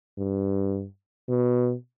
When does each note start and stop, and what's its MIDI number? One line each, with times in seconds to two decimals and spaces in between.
0.18 0.85 43
1.29 1.74 47